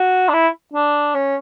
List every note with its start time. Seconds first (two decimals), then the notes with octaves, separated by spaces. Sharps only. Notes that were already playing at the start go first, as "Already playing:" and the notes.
Already playing: F#4
0.29 D4
0.33 E4
0.73 D4
1.14 C#4